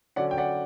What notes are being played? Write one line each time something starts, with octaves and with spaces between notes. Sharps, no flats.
D3 F#3 C#4 D5 F#5
G5
D5 F#5